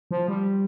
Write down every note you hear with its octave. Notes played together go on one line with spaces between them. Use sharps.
F3
G3